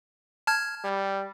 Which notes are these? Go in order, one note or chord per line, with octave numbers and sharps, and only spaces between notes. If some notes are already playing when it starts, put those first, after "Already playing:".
A5 F6 G#6
G3